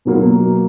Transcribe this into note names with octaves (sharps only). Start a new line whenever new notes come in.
B2 F#3 A#3